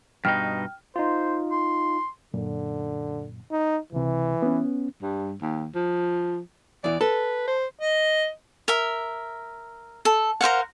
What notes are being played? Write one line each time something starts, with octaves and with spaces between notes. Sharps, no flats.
G2 B2 D#4 G5 F6
D#4 F4 C5
C6
F#2 A#2 D3
D#4
C#2 C3 E3
B3 C#4
G2
D#2
F3
E2 E3 D5
A4 B4
C5
D#5
A#4 E5
A4
A#4 C5 F5 F#5